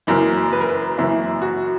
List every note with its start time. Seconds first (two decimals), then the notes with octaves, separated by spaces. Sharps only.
0.07 F#1 F#2 E3 A#4
0.53 B4
0.61 A#4
0.69 B4
0.97 F#1 F#2 E3 E4
1.42 F#4